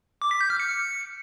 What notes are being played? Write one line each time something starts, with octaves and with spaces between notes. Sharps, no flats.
D6
B6
G6
F6
C#7